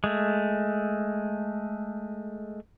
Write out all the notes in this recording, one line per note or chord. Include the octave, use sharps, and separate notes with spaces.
G#3 A3